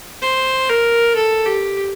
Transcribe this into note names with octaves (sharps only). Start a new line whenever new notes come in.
C5
A#4
A4
G4